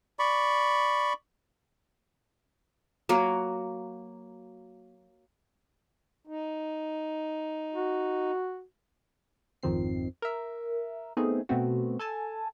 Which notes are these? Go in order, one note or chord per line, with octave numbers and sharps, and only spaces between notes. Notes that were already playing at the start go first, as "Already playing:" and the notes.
D5 B5 C#6
F#3 A#3 F#4
D#4
F#4
G#1 F2 D#3 F3 C4 C7
A#4 E5
A3 B3 C4 D#4 G#4
B2 A3 B3 C4 F#4
A4 G#5 A5